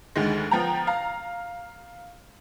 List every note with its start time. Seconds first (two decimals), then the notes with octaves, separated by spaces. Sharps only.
0.16 D2 D3 D#3 G#3
0.51 F3 B3 G5 A#5
0.87 F5 A#5